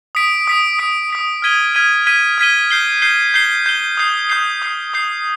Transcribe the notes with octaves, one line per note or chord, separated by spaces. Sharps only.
D#6 B6 D7
D#6 B6 D7
D#6 B6 D7
D#6 B6 D7
F6 G#6 B6 D#7 G7
F6 G#6 B6 D#7 G7
F6 G#6 B6 D#7 G7
F6 G#6 B6 D#7 G7
G6 C7 G7
G6 C7 G7
G6 C7 G7
G6 C7 G7
D#6 G6 C7
D#6 G6 C7
D#6 G6 C7
D#6 G6 C7